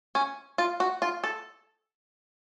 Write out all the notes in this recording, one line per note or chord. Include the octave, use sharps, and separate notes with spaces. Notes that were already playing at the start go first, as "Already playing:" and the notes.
C#4
F4
F#4
F4
A4